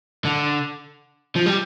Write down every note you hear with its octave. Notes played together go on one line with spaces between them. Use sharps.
D3
F3
G3